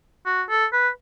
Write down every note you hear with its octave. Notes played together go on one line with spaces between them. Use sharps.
F#4
A4
B4